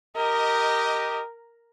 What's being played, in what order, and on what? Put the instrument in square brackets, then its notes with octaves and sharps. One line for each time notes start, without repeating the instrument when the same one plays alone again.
[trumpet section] G4 D#5 [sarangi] A#4